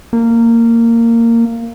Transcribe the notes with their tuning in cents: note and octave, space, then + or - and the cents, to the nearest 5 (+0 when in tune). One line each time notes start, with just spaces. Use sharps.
A#3 -15